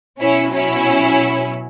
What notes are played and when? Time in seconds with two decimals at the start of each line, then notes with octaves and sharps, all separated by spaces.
0.20 B2 F#3 C#4 E4
0.53 C#4 E4